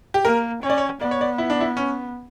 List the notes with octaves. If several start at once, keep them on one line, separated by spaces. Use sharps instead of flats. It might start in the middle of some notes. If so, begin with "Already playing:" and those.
G4
A#3 A#4
C#4 C#5
D5
C#5
B3 D5
C#5
D5
E4
D4
E4
C#4